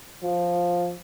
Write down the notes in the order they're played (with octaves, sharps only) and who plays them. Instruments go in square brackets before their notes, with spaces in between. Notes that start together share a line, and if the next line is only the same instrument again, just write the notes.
[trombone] F3